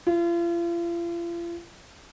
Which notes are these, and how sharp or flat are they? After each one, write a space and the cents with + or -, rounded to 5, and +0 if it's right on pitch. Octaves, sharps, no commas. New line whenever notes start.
F4 -40